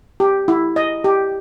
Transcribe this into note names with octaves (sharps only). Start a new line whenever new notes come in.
G4
E4
D#5
G4